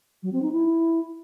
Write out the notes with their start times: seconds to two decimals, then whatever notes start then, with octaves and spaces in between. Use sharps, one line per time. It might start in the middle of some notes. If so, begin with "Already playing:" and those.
0.22 F#3
0.32 C4
0.42 D#4
0.52 E4